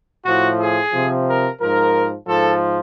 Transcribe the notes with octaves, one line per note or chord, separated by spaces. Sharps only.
A2 F3 F#4
G#4
C3 F3
A#4
G#2 F3 A#4
G#2 F3 A4